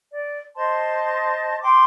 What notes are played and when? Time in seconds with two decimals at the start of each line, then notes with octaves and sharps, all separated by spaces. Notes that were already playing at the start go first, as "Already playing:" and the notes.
0.12 D5
0.56 C5 D#5 A5 C6
1.61 G5 C6 D6